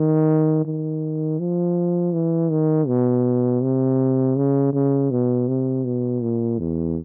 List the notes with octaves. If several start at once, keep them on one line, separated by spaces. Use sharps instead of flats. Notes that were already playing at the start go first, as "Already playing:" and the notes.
Already playing: D#3
D#3
F3
E3
D#3
B2
C3
C#3
C#3
B2
C3
B2
A#2
E2